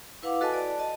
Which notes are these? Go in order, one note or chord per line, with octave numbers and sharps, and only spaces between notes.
E4 B4 F5 F#5 D6
F#4 A4 B4 D#5 G#5 A5
D5 A5
D#5 A5